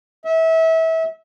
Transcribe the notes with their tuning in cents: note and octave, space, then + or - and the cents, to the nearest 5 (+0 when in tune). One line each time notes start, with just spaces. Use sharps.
E5 -25